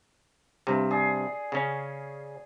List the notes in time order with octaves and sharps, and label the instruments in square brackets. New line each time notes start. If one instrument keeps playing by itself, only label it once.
[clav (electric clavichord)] G2 C3
[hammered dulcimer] G#4 D5
[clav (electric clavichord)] C#3 C#4